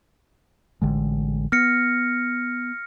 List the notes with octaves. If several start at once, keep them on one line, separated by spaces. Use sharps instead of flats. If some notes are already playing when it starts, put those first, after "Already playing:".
A1 D3 G#3
B3 F6 A#6 C#7